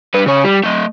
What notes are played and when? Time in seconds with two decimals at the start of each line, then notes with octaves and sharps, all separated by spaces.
0.14 G3 B4
0.26 C#3 C#5
0.45 G3
0.64 A3 D#5